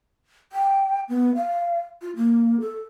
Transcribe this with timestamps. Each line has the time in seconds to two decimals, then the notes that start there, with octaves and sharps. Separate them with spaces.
0.52 G5
1.09 B3
1.36 F5
2.02 F4
2.16 A#3
2.60 A4